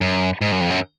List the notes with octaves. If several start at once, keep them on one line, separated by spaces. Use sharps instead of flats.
F#2
G#2
F#2
F2
F#2